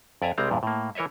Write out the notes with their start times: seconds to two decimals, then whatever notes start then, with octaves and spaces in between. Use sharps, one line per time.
0.22 F2 D5 E5 G#5 A#5
0.38 C2 G3 G#3 C4 A#5
0.51 E2 G2 A#2
0.63 A2 A#3
0.95 E3 A#4 C#5 D#5 E5